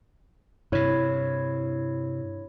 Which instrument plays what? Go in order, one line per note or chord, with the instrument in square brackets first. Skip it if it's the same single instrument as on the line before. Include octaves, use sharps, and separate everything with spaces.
[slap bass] G2 C3 [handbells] E4 C#5